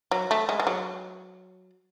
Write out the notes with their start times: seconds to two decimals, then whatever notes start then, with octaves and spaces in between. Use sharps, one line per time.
0.11 F#3
0.31 A3
0.49 G#3
0.60 G#3
0.67 F#3